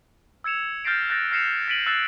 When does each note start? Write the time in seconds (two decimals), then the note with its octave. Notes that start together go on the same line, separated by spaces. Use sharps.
0.44 E6 G#6 C#7 E7 F7
0.85 F6 G6 A6 A#6 C7 D7
1.10 F#6 G6 A6 A#6
1.31 F6 A#6 C7 C#7 E7 F7
1.68 A6 B6 D7 D#7 F#7
1.86 E6 F#6 A6 C7 E7